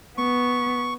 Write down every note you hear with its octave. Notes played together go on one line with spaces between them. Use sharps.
B3 C#6